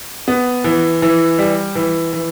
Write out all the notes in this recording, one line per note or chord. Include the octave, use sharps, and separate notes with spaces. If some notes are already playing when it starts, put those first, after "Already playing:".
B3
E3
E3
G3
E3
E3